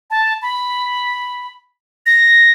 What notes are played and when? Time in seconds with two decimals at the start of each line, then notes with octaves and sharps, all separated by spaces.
0.11 A5
0.42 B5
2.06 A#6